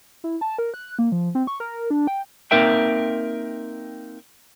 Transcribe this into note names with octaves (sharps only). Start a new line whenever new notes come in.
E4
A5
A#4
F#6
A#3
F3
C4
C#6
A#4
A#4
D4
G5
A#3 C4 D#4 A#4 E5 G5